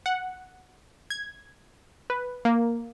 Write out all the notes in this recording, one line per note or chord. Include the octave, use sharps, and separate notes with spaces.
F#5
G#6
B4
A#3